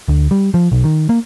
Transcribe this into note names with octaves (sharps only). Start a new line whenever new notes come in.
D2
G3
F3
B1
D#3
A#3